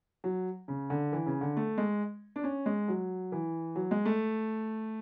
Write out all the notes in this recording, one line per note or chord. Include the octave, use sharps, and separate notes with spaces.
F#3
C#3
D3
E3
C#3
D3
A3
G#3
D4
C#4
G#3
F#3
E3
F#3
G#3
A3